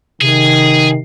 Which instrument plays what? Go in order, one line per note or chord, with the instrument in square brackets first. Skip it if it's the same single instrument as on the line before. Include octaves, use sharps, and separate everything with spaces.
[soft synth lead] C3 [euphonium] D#3 [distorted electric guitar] G#4